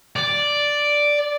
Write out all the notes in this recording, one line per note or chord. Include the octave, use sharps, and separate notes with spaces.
D5